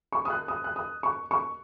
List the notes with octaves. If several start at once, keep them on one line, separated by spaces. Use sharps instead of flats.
C#6
D#6
F#6
D#6
F#6
D#6
C#6
C#6